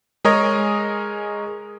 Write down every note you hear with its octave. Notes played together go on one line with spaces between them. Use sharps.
G#3 G#4 A#4 C#5 D#5